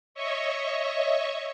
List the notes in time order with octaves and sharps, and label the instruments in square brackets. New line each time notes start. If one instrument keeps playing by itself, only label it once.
[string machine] C#5 D#5 E5 C#6